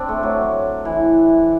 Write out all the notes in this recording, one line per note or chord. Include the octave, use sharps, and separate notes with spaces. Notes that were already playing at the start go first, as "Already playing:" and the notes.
Already playing: C4 D4
A3
F#3
E3